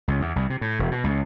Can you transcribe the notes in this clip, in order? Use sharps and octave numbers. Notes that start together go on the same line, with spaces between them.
C#2
E2
C2
C3
A2
E1
B2
C#2